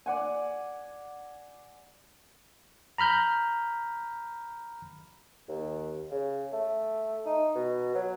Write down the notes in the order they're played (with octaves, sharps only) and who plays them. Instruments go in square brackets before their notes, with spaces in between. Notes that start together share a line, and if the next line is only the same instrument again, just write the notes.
[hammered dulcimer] D5 F#5 G#5
[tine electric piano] A#5 B5 F6 G6
[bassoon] D#2
C#3
A3
D#4
B2
F#3